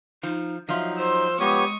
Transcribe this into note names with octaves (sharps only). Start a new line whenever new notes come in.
F3 D#4
F3 F#3 D#4 F4 E5
C5 C6 E6
G#3 B3 G4 C#5 C#6 D#6